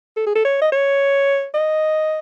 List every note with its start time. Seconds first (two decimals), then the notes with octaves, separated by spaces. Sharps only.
0.17 A4
0.26 G#4
0.35 A4
0.45 C#5
0.62 D#5
0.72 C#5
1.54 D#5